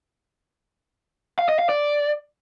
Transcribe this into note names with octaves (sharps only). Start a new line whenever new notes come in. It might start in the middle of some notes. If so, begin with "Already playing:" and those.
F5
D#5
F5
D5